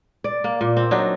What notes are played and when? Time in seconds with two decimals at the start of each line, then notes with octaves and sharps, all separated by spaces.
0.24 D5
0.44 A#3
0.61 A#2
0.77 C4
0.91 F#3 D4 D#4